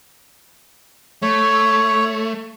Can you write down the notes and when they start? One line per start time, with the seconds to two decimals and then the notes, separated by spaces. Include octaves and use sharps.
1.22 A3 C#5